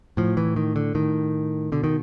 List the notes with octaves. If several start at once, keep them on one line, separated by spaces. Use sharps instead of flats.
A2 F3
E3
D#3
D3
A2 D#3
B2 D3
D#3